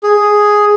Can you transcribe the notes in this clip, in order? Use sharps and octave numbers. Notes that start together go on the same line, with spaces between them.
G#4